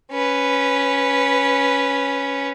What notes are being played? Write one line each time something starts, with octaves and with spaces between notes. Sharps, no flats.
C#4 B4